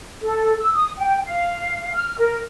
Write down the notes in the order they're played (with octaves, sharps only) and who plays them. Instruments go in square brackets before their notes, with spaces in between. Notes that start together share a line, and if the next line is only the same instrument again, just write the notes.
[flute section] A4
E6
D#6
G5
F5
F6
A#4